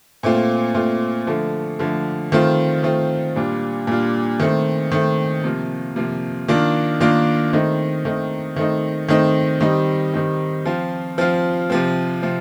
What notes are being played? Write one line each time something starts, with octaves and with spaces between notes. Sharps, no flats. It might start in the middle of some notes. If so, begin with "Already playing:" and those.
A#2 A3 C4 F4
A#2 A3 C4 F4
D3 F3 A3
D3 F3 A3
D#3 A3 C4 F4
D#3 A3 C4 F4
A#2 G3 D4 F4
A#2 G3 D4 F4
D#3 A3 C4
D#3 A3 C4
C3 F3 A#3
C3 F3 A#3
D#3 A#3 D4 F4
D#3 A#3 D4 F4
D#3 A3 C4 D#4
D#3 A3 C4 D#4
D#3 A3 C4 D#4
D#3 A3 C4 D#4
D#3 G3 C4 D#4
D#3 G3 C4 D#4
F3 C4 F4
F3 C4 F4
C3 F3 C4
C3 F3 C4